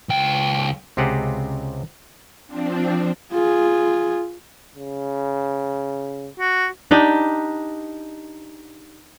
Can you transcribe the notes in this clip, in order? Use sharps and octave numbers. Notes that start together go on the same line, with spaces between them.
C#2 G5
C#2 C3 C4 G4 G#4 F#5
F3 C4 D4
F4 G#4
C#3
F#4
D4 D#4 G4